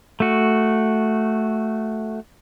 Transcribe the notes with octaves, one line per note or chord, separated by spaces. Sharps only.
A3 F#4